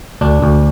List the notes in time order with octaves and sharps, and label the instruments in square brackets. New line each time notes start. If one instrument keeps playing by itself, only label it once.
[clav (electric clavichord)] D2 D4
D2